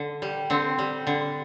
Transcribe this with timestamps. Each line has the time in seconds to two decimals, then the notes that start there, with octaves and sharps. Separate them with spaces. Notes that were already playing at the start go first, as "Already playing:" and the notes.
Already playing: D3
0.22 G3
0.50 D3 C4
0.79 G3
1.07 D3